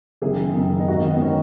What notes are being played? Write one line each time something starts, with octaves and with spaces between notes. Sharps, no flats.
F#1 F#2 D#3 G#4
F#1 F#2 D#3
D#4
G#1 G#2 D#3 F#4
B3
D#4
D#3 C#4